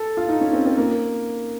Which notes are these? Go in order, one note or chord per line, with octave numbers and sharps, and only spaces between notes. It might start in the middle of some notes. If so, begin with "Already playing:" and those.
Already playing: A4
F4
D#4
C#4
C4
C4
A#3